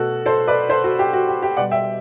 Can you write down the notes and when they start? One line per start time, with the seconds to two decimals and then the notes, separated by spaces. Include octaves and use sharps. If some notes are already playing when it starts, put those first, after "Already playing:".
Already playing: B2 A3 F#4 A4
0.26 A4 C5
0.48 B4 D5
0.69 A4 C5
0.84 F#4 A4
0.99 G4
1.13 F#4
1.28 G4
1.43 G4
1.57 B2 G3 D5 F#5
1.71 E5 G5